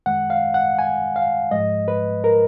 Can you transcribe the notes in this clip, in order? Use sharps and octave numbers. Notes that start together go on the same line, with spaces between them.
F#2 D#3 G#3 F#5
F5
F#5
G#5
F5
G#2 F3 G#3 D#5
B4
A#4